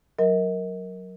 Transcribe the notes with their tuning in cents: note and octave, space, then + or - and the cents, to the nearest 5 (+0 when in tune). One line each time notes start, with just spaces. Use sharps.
F#3 +0 A#4 +0 D#5 +40